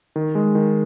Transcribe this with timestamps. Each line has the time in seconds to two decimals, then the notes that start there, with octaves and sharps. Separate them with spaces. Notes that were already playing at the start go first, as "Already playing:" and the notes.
0.16 D#3
0.35 G#3
0.55 D#3